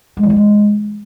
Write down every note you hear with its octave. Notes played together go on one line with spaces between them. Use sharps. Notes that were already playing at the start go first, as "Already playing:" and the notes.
G#3
E3
G3
G#3